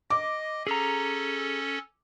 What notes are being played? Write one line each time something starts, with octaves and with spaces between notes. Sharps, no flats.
D#5 D6
C#4 G#4 A4 A#5